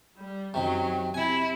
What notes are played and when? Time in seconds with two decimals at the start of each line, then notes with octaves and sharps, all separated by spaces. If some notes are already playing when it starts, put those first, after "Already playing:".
0.17 G3
0.54 F#2 C3 D#3 F#3
1.14 C3 E4 G#5